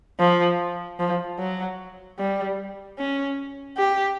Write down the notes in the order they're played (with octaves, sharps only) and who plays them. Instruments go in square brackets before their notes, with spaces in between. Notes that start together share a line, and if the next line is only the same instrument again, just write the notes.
[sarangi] F3
F3
F#3
G3
C#4
G4